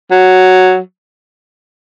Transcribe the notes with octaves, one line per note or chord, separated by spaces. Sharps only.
F#3